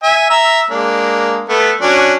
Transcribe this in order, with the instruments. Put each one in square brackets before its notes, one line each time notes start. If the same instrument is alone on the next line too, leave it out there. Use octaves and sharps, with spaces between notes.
[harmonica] E5 G#5
E5 A#5
G#3 A#3 D4
A3 B3
F#3 C#4 D4